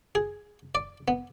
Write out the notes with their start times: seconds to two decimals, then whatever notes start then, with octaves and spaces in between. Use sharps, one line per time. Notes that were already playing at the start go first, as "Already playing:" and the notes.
0.15 G#4
0.75 D5
1.08 B3